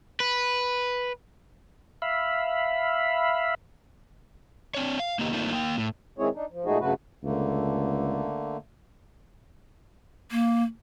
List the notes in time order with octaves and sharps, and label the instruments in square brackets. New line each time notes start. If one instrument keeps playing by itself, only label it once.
[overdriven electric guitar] B4
[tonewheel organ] E5 F5 B5
[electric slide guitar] C4 D4 C#5
F5
A#3 B3 D#4 G4
A3 A#3 C4 D4 D#4 F4
A#3 G5
A2
[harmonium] D#3 G#3 C4 E4 G#4 C#5
D4 D#4
F3
A#2 G#3 A3 D#4 F#4 G#4
G2 C#3 F#3 A3 F#4 B4
[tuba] C#2 [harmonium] D3 A3 A#3
[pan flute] A#3